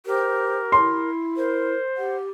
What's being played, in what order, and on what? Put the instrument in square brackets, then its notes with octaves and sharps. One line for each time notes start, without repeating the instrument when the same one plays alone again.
[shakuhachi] G4 [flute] A#4 [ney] C5
[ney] E4 [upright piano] C6
[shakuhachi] A#4 [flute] C5
[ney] G4 [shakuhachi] F#5